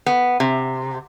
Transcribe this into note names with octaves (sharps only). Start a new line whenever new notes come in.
B3
C3